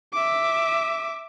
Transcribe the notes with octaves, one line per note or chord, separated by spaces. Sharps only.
E5 D6